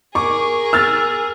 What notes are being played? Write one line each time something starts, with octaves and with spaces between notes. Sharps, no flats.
G#4 A#4 C#6 D6
E6 F6 A6